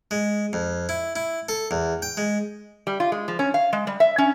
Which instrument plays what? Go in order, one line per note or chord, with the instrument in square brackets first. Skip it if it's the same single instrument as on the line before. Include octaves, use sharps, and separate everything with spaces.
[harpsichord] G#3
F2
E4
E4
A4
E2
G5
G#3
[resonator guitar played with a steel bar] G3
F4
G#3
F3
C#4
F5
G#3
G3
E5
C#4